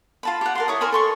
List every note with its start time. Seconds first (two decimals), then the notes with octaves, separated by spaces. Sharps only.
0.23 F4 A5 B5
0.41 G4 F#5
0.55 A#4 A5 C6
0.68 E4 C#5 A#5 D#6
0.81 A#4 C5 G#5 B5
0.92 A4 C6 C#6